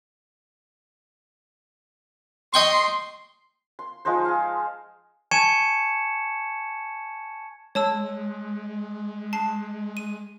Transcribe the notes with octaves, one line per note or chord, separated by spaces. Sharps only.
D#5 G5 C6 C#6
C6
F3 G#3 D#4 C5
G#4 F5
G#5 A5 C#6 G#6 C#7 E7
G#3 C#5 A5 E6
A5 C7
D#7